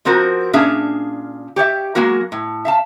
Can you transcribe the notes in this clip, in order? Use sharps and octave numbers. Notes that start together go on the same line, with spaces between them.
F3 C4 F4 F#4 A#4
A#2 C#4 D4 G#4 E5 F5
G4 C#5 D5 E5
F#3 G#3 A#3 F#4 A#4
A2
E5 F5 A5